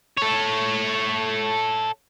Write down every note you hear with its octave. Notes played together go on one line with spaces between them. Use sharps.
A4 C#5